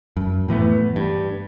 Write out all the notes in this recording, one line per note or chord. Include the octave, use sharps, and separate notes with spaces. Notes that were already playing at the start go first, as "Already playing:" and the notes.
F#2
A2 E3 A3 B3
G2